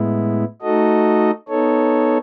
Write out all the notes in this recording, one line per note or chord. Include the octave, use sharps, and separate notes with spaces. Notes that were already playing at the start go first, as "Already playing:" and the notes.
Already playing: A2 G#3 B3 E4
A3 D#4 F#4 A4 D#5
B3 D#4 A4 C#5